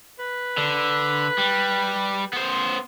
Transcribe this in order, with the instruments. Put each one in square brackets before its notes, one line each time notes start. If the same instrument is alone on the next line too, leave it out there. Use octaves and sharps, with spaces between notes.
[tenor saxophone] B4
[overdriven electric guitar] D3
G3
B3 C5